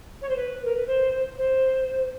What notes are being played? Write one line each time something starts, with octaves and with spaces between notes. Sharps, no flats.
C#5
C5
B4
A#4
B4
C5
C5